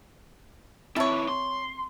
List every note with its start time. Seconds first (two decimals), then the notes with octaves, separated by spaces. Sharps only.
0.96 D#3 C4 E4 A4 C#5 E5
1.28 C6